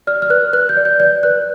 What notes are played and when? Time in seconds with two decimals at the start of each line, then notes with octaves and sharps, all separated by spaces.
0.07 D5 F6
0.22 F6
0.30 B4 F#6
0.53 B4 F#6
0.69 G6
0.77 D5
0.85 G6
1.00 D5 G6
1.23 B4 F#6